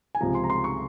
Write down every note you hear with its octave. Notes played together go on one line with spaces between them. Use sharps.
G#5
C#2 C3 F3 A#5
C6
A#5
C6
C#6